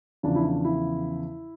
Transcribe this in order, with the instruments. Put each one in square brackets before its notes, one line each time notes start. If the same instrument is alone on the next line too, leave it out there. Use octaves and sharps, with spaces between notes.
[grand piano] E2 C#3 F3 D4
E4
D4
E4